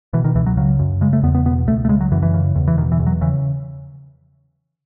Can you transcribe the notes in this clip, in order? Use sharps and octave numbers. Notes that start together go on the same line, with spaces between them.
B2 E3
D#3
C#2 E3
F#3
C#3 F#3
F#2
C#3 G#3
A3
E2 B3
B3
B2 B3
C#2 A3
A3
C#3 G#3
F#3
F#2 E3
E3
C#3
E2
E3
B2 D#3
E3
E2
F#3
C#3 E3